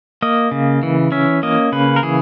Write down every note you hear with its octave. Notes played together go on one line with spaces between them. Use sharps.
A#3 D#5
C#3
E3
C#4 E5
A#3 D#5
C#3 B4
A#4
E3 G#4